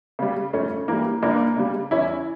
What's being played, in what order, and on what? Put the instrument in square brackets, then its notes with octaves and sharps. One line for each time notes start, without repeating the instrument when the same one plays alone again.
[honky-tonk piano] C#3 G3
F2 A3 C#4
E3 G3 A#3
C#2 A#3 D4
C#3 G3
E2 C#4 E4